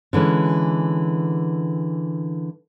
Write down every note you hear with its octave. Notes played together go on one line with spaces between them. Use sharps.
D3 E3 G#3 C#4